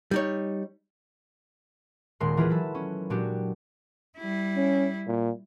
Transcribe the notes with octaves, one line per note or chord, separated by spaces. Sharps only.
G3 D#4 C#5
D#1 A#2 G#3 C6
E3 F4 G4 G#4 B4
F#3 A4
C#4
A#2 F#3 G#3 D4 F#4 G4
G3 E4
C#4
A#2